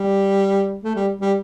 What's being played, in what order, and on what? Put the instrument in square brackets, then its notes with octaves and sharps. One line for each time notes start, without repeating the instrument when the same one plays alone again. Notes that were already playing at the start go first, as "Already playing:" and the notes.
Already playing: [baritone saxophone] G3
A3
G3
G3